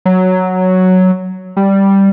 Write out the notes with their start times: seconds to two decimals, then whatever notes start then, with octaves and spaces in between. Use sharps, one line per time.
0.05 F#3
1.56 G3